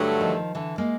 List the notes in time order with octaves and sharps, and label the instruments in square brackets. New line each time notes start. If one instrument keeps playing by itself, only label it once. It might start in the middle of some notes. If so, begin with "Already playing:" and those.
Already playing: [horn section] G2 D3 F#3 A3
[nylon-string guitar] D#3 F3
D3 E3
G#3 A#3